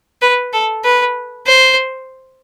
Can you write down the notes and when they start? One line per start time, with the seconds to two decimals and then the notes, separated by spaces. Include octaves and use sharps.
0.22 B4
0.53 A4
0.84 B4
1.46 C5